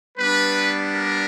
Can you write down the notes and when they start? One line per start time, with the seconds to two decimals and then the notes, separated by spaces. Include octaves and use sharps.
0.18 G3 B3 D4 B4
0.96 A#4